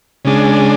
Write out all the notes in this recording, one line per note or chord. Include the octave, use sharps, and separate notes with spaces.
C#3 G#3 D4